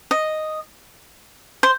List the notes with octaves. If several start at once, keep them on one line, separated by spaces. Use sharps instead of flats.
D#5
C5